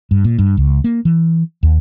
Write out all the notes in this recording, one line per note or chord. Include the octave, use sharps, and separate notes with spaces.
G2
A#2
G2
C#2
A#3
E3
D#2